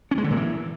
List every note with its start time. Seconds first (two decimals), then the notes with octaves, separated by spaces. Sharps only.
0.11 C#4
0.18 G#3
0.24 D3
0.31 A#2
0.37 E3